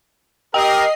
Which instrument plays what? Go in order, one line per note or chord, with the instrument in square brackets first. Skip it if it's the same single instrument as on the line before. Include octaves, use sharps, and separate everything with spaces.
[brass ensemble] G4 A#4 [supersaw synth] D#5 C7 [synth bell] G5